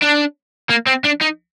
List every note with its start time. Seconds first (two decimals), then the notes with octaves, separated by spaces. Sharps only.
0.02 D4
0.69 A#3
0.86 C4
1.04 D4
1.21 D#4